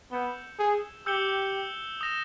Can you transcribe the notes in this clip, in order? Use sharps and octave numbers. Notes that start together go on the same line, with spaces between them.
B3 E6 G6 C#7 E7 G7
G#4
G4 E6 G6 C#7 E7 G7
D#6 A#6 E7 G7